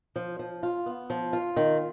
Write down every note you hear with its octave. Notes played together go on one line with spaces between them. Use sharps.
F3
F3
F4
B3
F3
F4
D#3